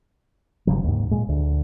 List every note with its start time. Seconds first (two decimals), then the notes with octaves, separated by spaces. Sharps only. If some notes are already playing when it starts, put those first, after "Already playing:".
0.67 G1 C#3 F#3
0.84 D#2 G#2
1.11 A#2 G#3
1.29 D2